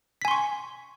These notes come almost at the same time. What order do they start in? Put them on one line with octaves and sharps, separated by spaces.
B6 G#5 C6 C#6